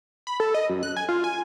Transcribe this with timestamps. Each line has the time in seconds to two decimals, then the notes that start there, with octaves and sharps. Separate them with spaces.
0.27 B5
0.40 A4
0.54 D#5
0.70 F#2
0.83 F#6
0.96 G#5
1.09 F4
1.24 G#5